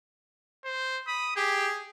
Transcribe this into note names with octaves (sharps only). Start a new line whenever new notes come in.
C5
B5 D#6
G4 G#4